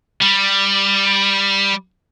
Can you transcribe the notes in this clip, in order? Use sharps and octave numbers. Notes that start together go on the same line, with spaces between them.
G3